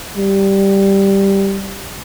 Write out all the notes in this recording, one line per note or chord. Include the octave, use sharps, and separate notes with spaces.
G3